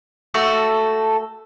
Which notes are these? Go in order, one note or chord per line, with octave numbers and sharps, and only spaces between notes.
A3 F#4 A4